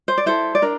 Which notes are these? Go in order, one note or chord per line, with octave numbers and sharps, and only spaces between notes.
C5
D5
E4 A4 C5
D5
D4 A#4